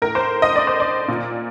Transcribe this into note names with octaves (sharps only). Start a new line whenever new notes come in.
A2 A#4
C5
D#5
D5
C5
D5
A#2